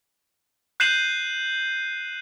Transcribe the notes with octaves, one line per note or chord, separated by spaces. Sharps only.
F#6 G6 C7 D#7 E7 F#7